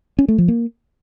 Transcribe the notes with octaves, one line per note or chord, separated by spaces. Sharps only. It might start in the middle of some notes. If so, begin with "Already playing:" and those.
C#4
A3
F3
A#3